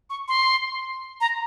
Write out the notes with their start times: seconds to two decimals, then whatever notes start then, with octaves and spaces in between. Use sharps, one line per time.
0.10 C#6
0.28 C6
1.21 A#5